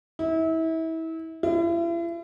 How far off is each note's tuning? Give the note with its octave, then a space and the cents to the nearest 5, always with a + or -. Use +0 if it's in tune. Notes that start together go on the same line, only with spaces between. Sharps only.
E4 -30
E4 +40